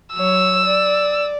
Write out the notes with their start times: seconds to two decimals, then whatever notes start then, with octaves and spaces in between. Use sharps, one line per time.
0.14 F#3 C#5 E6
0.65 D5